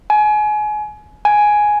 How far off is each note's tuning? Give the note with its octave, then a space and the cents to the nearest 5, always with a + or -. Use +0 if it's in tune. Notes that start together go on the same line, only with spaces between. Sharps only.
G#5 +30
G#5 +5